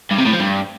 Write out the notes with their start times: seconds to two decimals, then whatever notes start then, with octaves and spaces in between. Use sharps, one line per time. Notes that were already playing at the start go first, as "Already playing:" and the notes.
0.11 G2
0.18 C3
0.25 A2
0.32 F3
0.40 G2